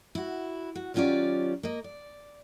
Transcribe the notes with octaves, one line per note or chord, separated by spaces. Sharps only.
E4 F#4
F#4
D#3 F#3 C#4 F4 G4 D5
A#3 D#5
D5